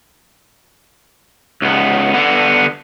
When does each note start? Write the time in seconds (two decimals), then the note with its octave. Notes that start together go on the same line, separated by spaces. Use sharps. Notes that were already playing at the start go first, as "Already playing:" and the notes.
1.62 C#2 B3
2.13 D3 B3